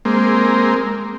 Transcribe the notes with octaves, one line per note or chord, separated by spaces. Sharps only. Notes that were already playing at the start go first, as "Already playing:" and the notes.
G#3 A#3 C4